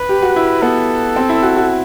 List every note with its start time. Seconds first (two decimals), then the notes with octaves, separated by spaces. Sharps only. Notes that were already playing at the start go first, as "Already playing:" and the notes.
Already playing: B4
0.09 G4
0.22 F#4
0.36 E4
0.62 B3 A4
1.16 C4
1.29 E4
1.42 F#4
1.56 F#4